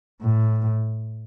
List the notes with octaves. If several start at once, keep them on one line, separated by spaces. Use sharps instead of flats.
A2